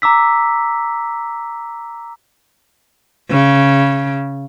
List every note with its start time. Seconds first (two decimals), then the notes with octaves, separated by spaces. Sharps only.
0.02 A#5 D6 E6 B6
3.30 C#3